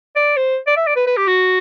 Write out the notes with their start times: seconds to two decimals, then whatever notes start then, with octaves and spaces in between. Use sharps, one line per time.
0.16 D5
0.36 C5
0.67 D5
0.76 E5
0.87 D5
0.96 B4
1.07 B4
1.17 G4
1.27 F#4